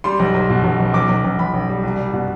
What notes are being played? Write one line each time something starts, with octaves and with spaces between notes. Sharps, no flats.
G3 C6
B1
B1
B2
B1
B1
B1 D6
B1
B1
B1 B5
B1
G3
C2
G3
B2